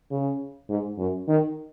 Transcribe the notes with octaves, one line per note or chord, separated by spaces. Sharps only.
C#3
G#2
F#2
D#3